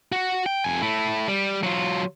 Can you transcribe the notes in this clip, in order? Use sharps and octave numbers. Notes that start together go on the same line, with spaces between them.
F#4
G5
F2 G#5
A3 E4
G3
F#3 F4